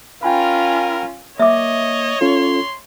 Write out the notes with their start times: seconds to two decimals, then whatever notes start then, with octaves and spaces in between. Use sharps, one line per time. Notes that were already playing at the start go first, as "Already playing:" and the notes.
0.23 C#4 F4 A#4 G5 G#5 B5
1.39 A#3 C#5 D#5 E5 D6
2.21 C#4 F4 A4 C6